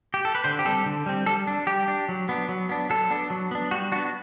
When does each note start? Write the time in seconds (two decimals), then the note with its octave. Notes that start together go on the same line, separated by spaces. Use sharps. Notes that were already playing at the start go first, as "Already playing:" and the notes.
0.14 G4
0.25 A4
0.35 B4
0.44 D3 C5
0.59 G4
0.65 G3 C4 A4
0.86 D3
1.06 G3 C4
1.26 G3 A4
1.47 D4
1.67 G3 G4
1.88 D4
2.09 F#3
2.29 B3 D4
2.49 F#3
2.69 B3 D4
2.90 F#3 A4
3.10 B3 D4
3.30 F#3
3.51 B3 D4
3.71 G3 F#4
3.92 D4 F#4
3.96 B3